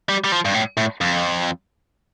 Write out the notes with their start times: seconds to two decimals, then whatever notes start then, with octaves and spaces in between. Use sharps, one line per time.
0.09 G3
0.24 G3
0.32 F3
0.45 G2
0.54 A2
0.77 A2
1.01 F2